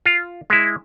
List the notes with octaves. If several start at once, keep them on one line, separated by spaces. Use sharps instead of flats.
F4
G#3 E4